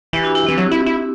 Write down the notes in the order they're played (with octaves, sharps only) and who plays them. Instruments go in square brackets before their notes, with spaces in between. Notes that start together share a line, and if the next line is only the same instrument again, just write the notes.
[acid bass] E3 [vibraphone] E4 G4
[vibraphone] D4 F#4
E4
[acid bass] E3 [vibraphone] C4
[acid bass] F#3
E4
E4